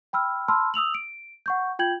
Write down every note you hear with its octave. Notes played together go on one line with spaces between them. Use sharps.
G5 B5 E6 F6
A5 B5 C6 E6 F6
D#6 E6 F7 F#7
D7
F#5 C#6 G6
F4 G5 G6 G#6 F#7